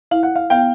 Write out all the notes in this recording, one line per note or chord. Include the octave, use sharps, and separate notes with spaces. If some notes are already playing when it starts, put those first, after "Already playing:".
E4 F5
F#5
F5
B3 F5 G5